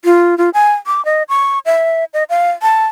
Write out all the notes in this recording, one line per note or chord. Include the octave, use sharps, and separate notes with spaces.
F4
F4
G#5
D6
D#5
C#6
E5
D#5
F5
A5